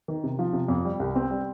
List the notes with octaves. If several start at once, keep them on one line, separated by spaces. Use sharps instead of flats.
D#3
C3
F3
C3
F2
G3
C2
C4
G3